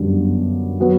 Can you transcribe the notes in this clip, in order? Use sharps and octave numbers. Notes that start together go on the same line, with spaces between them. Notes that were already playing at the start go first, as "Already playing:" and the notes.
Already playing: G1 F#2 D3 G3
F#3 B3